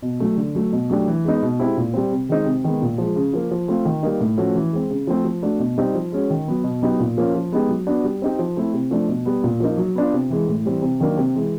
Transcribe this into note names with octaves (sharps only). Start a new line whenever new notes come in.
B2
F#3 A3
D3
F#3 A3
B2
F#3 A3 D4 G4
E3
G#3 B3 D#4
B2
G#3 C4 E4 G4
A#2
G3 C4
C3
D#3 G#3 C4 D#4
C3
D#3 G#3 B3
A#2
F3 G#3
C#3
F3 A#3
F3
A3 C4 F4
D#3
G3 A#3 D#4
A2
F3 A3 C#4 F#4
E3
G#3 C4
C#3
F3 A3 C4
F3
A3 D4 F#4
B2
G3 C4 D#4
F3
G#3 C#4 F#4
D#3
F#3 B3
B2
F#3 B3 D#4 G4
A#2
F3 A#3 C#4 F4
F3
G#3 B3 D#4 G4
F#3
B3 D4 F#4
G3
C4 D#4 G4
F3
A3 C4 E4
C3
F3 A3 D4
B2
G3 B3
A#2
F3 A#3 D#4
F#3
B3 D4 F4
C3
E3 G#3
A2
E3 G3 C4
C3
D#3 F#3 A#3 D4
C3
E3 G#3